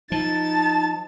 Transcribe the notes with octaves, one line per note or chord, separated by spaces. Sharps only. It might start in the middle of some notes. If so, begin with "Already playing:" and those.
F3 D#4 A5 A6